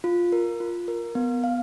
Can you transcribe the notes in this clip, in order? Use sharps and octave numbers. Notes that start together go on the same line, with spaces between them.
F4
A#4
F4
A#4
B3
F5